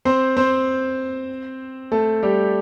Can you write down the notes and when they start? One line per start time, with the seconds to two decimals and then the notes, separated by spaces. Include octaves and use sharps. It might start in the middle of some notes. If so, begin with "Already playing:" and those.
0.05 C4 C5
0.37 C4 C5
1.92 A3 A4
2.23 G3 G4